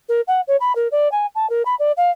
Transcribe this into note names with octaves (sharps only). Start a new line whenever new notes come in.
A#4
F#5
C#5
B5
A#4
D5
G#5
A5
A#4
B5
D5
F5